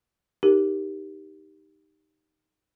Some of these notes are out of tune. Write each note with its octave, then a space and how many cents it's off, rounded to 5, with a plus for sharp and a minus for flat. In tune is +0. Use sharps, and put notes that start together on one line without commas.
D#4 +0 G4 +0 A#4 +0